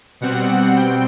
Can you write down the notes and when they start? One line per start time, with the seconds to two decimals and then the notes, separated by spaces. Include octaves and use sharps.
0.21 B2 G3 C4 F#5
0.76 G5